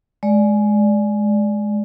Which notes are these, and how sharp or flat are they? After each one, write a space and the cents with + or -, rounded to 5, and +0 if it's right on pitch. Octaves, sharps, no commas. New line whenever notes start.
G#3 +15 D5 +0